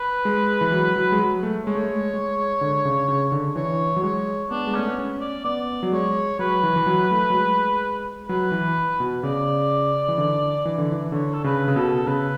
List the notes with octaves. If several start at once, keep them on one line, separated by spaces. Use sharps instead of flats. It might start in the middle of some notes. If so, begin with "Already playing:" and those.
Already playing: B4
G#3
E3
F#3
F#3
G#3
F#3
A3
G#3 C#5
A3
G#3
G#3
D3
C#3
C#3
D3
E3 C#5
F#3
G#3 C#5
B3 D4
G#3
A3 C#4
B3
C#4
D5
B3 D5
F#3
G#3 C#5
F#3 B4
E3
E3
F#3
A3
F#3
G#3
F#3 B4
E3
B2
C#3 D5
E3
D3
E3
D3
E3
D3 C#5
A4
C#3 B4
C#3
B2 A4
C#3 B4